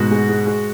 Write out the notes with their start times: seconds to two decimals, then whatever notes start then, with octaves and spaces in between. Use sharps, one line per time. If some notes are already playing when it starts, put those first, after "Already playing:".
Already playing: G#2 B2 F#4
0.11 G#3
0.29 G#3
0.46 G#3